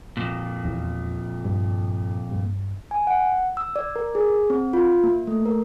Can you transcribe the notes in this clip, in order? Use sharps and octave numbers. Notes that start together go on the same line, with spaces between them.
F2 A#2
E2
G2
G2
G#5
F#5
E6
D5
A#4
G#4
C4
F4
A#3
A3
A#4